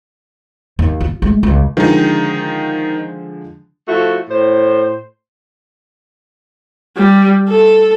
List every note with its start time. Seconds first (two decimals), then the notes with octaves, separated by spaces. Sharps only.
0.79 D#2
1.01 F4
1.22 G#3 A3
1.43 C#2
1.77 D3 D#3 F3 G#3 D#4
3.88 F3 A3 E4 F#4
4.29 A2 C5
6.97 G3
7.49 A4